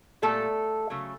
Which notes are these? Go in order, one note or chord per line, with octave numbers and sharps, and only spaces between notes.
A#2 G3 A3 A4
C#3 F#3 A3